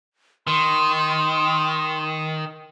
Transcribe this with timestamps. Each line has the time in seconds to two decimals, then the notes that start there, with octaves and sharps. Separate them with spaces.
0.47 D#3 C6